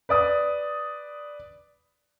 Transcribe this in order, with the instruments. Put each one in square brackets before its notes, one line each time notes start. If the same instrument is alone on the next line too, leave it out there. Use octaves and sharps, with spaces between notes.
[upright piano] B4 D5 D#6